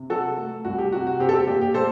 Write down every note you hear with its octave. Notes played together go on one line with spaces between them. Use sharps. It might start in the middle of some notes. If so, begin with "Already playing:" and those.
Already playing: C3
F#3 F#4 A4
A3
C2 F#4
G4
C3 F#4
F#4
C4 G4
A4
G4
A#2 G4
G4
A#2 A4 C5